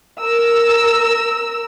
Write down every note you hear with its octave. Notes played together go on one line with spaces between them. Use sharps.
A#4 E6